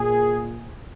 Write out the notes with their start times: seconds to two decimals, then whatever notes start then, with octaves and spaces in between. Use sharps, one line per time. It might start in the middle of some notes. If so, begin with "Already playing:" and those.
Already playing: A#2 G#4